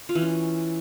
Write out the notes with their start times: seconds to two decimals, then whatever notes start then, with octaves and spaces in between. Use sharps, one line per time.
0.09 F4
0.15 E3
0.22 C#4